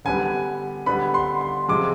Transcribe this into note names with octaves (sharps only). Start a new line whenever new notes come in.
D3 G3 B3 G#5
D3 G3 B3 B5
C6
C6
C3 F3 G#3 D6